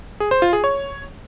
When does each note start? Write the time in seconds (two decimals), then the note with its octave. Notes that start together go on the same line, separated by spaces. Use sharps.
0.20 G#4
0.31 C5
0.42 F4
0.53 G#4
0.64 C#5